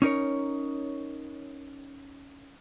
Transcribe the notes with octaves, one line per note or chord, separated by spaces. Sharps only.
C#4 D#4 A#4 C#5